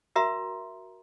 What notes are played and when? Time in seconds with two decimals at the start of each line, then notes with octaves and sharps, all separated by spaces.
0.16 F#4 A#4 E5 A#5 C6